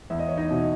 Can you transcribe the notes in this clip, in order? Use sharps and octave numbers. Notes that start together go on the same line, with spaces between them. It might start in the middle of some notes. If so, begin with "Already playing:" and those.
E2 E5
D#5
C#5
D#4 D#5
B2